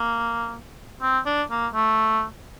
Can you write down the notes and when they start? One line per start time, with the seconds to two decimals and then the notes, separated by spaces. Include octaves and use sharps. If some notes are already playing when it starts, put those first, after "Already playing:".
Already playing: A#3
1.02 C4
1.26 D4
1.51 A#3
1.74 A3